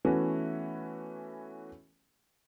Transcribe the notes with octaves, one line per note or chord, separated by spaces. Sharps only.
E3 A3 B3 C#4 E4 F#4